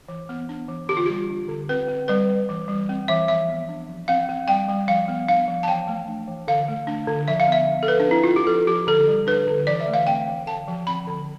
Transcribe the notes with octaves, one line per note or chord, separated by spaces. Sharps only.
E3
B3
D4
E3
D3 G4
F4
G3 G4
D4
D3
C4 B4
C4
G3 B4
G3
E3
G3
C4
E3 E5
F3 E5
B3
D4
F3
C4 F5
C4
G3 G5
G3
F3 F5
B3
D4 F5
F3
A5
E3 G5
A3
D4
E3
D3 F5
A3
D4
D3
F3 E5
F5
B3 E5
D4
A4
F3 B4
D4
C4 E4
C4 F4
G4
F3 A4
F3 G4
D3 A4
G3
D4 B4
D3
E3 D5
E5
A3
F5
C4 G5
E3
D3 A5
F3
C4 B5
D3